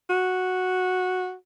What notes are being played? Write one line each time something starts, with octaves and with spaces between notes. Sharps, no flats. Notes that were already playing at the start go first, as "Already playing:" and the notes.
F#4